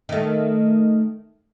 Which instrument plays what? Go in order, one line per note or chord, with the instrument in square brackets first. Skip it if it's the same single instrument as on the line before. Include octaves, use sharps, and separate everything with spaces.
[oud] D#3 A3